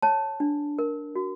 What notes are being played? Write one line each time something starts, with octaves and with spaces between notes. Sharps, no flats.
C#5 A5
D4
A#4
F#4